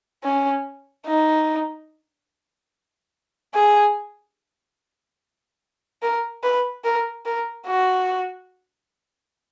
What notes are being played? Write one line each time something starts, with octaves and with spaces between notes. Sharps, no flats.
C#4
D#4
G#4
A#4
B4
A#4
A#4
F#4